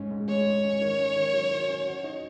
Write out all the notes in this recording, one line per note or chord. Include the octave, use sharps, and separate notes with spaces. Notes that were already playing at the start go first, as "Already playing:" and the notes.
Already playing: G#2 C#4
G#2
G#3 C#5
G#2
C#4
D#3
C#4
D#3
F#3
D#3
C#4
F#4
D#4